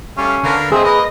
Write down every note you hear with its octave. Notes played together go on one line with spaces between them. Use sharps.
G3 A3 C#4 F5
D3 A#4 B4 F5
D2 C4 G#4 D#5 E5
A#3 A#4 B4 D#5